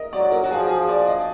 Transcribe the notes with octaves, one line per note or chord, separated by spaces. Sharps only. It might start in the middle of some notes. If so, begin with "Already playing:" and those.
Already playing: A#4 D#5
F#3 D5
A#4
F#4
F3 G#4
G#4
D5
D#5